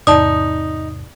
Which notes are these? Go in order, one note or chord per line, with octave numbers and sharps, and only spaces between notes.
E2 G#2 C3 D#4 D5 A5 D#6